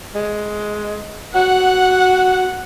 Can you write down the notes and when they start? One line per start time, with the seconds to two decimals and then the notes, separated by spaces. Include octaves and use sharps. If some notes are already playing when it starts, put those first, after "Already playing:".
0.15 G#3
1.35 F#4 F#5